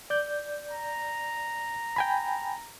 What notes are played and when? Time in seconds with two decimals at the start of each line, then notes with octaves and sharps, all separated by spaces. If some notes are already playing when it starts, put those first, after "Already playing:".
0.10 D5 G6
0.71 A#5
1.96 G5 G#5 B5